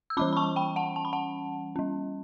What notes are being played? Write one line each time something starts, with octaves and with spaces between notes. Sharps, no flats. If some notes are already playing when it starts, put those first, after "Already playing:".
E6
E3 G3 C#4 B5 D6
B5
A5 C#6
G5 B5
F#5 A5
A5
B5
F#5 A5
G3 C#4